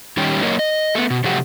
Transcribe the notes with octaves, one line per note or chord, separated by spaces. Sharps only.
D#3 G3 C#4 G4
F#3 A#3 A#4 C#5 D#5
D#5
A3 B3
B2
C3 F3 F#3 A3 G4 F#5